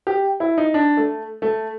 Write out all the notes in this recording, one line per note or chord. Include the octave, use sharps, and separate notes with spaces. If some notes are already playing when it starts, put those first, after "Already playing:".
G4
E4
D#4
D4
A3
A3